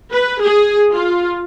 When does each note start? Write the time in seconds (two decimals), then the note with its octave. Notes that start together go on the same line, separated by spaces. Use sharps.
0.11 B4
0.41 G#4
0.92 F4